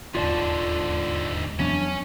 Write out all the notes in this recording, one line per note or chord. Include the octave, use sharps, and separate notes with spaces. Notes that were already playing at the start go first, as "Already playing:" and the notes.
D#1 E2 G#2 D3 F4 D5 A5
F2 E3 F#3 B3 C#4 D4